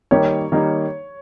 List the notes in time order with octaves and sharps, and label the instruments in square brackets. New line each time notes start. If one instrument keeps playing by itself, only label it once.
[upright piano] D#3 G3 A#3 D#4 G4 [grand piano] C#5
[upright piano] D#3 G3 A#3 D#4